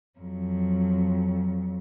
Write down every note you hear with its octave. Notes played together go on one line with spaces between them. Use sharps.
F2 F#3